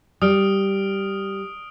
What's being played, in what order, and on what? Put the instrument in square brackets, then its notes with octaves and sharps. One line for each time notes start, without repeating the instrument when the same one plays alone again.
[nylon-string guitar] G3 [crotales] D#6 F6 D7